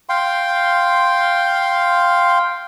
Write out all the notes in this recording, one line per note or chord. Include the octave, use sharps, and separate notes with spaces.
F5 G5 C6